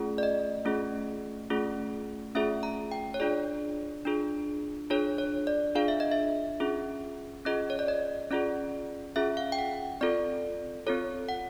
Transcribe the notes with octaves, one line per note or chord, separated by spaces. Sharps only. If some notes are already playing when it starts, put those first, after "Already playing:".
Already playing: A3 C#4 F4 G#4
D5
D#5
A3 C#4 F4 G#4
A3 C#4 F4 G#4
A3 C#4 F4 G#4 E5
A#5
G5
C#5
D4 F4 G#4 D5
D4 F4 G#4
D4 F4 G#4 C#5
C#5
D5
D4 F4 G#4 F5
E5
D#5
E5
C#4 F4 G#4
C#4 F4 G#4 D#5
C#5
D5
D#5
C#4 F4 G#4 D5
C#4 F4 G#4 E5
F5
G5
F#5
C4 F4 A4 D5
C4 F4 A4 C#5
F#5